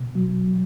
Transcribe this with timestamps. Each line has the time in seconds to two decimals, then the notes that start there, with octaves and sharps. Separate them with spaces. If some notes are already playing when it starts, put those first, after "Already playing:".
Already playing: B2
0.15 F#3